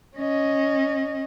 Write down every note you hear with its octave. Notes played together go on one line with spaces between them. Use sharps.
C#4 D#5